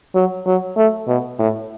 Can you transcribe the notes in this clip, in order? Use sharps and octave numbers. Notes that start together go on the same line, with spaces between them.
F#3
F#3
A3
B2
A2